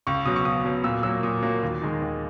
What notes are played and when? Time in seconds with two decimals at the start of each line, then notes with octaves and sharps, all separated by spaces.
0.07 C#2 C#6
0.25 B2 F#3 D#6
0.36 C#6
0.45 C#2 D#6
0.65 B2 F#3
0.84 A#2 E6
1.03 F#3 A#3 E6
1.23 A#2 D#6
1.42 F#3 A#3
1.63 D#2
1.82 D#3 G#3
2.02 D#2